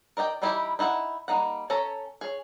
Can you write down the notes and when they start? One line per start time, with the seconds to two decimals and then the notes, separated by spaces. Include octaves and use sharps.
0.17 A#4 D5 D#5 G5
0.42 E3 G3 D#4 E4 G4
0.79 D#4 E4 F#4 F#5
1.28 G3 A#3 D#4 F#5
1.70 C#4 A4 C#5 A5 A#5
2.21 G#4 C#5